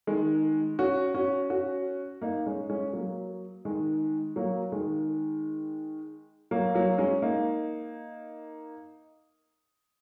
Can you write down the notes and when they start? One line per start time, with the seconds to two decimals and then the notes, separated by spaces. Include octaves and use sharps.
0.07 D#3 G#3
0.79 C#4 F#4
1.14 C#4 F#4
1.50 C#4 F#4
2.21 A#3 D#4
2.46 G#3 C#4
2.70 G#3 C#4
2.93 F#3 A#3
3.65 D#3 G#3
4.36 F#3 A#3
4.72 D#3 G#3
6.51 F#3 A#3
6.75 F#3 A#3
6.98 G#3 C#4
7.22 A#3 D#4